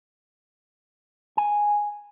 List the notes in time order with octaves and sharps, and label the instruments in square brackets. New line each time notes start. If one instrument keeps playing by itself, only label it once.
[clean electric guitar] G#5